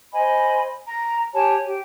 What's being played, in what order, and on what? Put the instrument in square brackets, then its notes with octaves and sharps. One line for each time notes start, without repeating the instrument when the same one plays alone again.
[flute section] C5 D#5 G#5 B5
A#5
G4 C#5 G#5 A5
G4